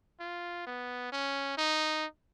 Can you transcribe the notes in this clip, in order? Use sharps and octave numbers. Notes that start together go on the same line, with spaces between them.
F4
B3
C#4
D#4